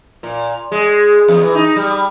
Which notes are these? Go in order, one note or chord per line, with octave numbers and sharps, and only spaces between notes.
A#2
G#3
E2
E3
D#4
G3